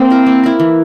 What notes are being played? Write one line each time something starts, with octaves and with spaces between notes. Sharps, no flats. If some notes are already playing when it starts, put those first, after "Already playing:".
Already playing: A#3 C4
E4 A#4
A#3
E4 A#4
E3